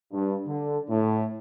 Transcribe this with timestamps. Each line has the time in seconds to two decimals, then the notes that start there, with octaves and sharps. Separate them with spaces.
0.13 G2
0.47 D3
0.90 A2